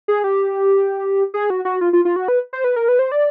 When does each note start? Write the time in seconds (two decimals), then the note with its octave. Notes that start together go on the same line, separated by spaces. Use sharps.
0.08 G#4
0.24 G4
1.34 G#4
1.50 F#4
1.65 F#4
1.81 F4
1.93 F4
2.05 F4
2.16 F#4
2.28 B4
2.53 C5
2.64 B4
2.76 A#4
2.88 B4
2.99 C5
3.12 D5